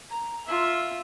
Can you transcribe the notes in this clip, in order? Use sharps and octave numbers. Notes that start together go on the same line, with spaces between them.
A#5
F4 E5